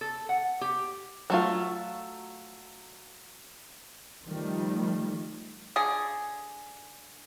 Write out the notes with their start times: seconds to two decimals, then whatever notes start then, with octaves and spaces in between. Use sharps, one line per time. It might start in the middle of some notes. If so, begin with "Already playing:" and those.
0.01 A4
0.29 F#5
0.61 G4
1.30 F#3 A3 F4
4.25 D#3 F3 G3 A3
5.76 D3 G#4